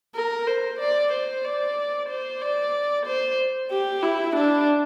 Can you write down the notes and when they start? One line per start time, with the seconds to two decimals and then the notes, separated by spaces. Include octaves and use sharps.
0.15 A#4
0.47 C5
0.80 D5
1.12 C5
1.44 D5
2.09 C5
2.41 D5
3.06 C5
3.70 G4
4.03 E4
4.36 D4